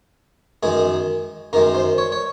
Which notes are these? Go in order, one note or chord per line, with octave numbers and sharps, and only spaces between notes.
F#2 D#3 G#3 G#4
F#2 D#3 G#3 A#4
C5
C#5
C#5